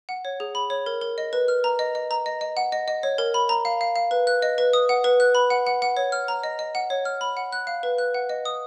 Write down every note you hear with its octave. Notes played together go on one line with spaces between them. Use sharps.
F#5
C#5
G#4
B5
C#5
A#4
A#4
D#5
B4
F6
A#5
D#5
D#5
A#5
D#5
D#5
F#5
D#5
D#5
C#5
A#4
B5
A#5
F5
F5
F5
B4
F#6
D#5
B4
D#6
F#5
B4
F#6
B5
F#5
F#5
F#5
C#5
F6
A#5
D#5
D#5
F#5
C#5
F6
B5
F#5
F#6
F5
B4
F#6
F#5
D#5
D#6